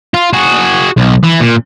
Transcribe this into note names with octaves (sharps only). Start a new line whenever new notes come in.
F4
F#4 G#4
B1
E3
A#2